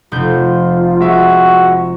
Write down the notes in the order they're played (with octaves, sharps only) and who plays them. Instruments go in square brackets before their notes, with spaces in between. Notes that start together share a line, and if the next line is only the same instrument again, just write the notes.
[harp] F1 G6 [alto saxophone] F4
[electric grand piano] G#3 E5 [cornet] F#4